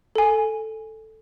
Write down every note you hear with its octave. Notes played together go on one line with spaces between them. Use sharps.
A4 G#5